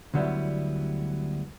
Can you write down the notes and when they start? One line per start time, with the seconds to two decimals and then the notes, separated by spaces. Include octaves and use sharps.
0.14 D2 D3 F#3 G3 B3 E4